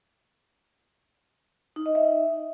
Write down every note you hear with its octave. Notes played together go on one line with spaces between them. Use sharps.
D#4
D#5
E5